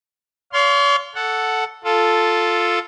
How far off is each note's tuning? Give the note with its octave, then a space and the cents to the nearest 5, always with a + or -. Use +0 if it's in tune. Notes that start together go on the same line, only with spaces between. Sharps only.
C#5 +45 F5 +0 C6 +0
A4 +0 F#5 +0
F4 +0 A4 +0